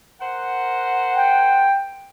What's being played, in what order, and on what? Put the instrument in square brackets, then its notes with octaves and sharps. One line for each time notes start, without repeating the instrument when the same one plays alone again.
[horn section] A#4 C5 F#5
[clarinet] G5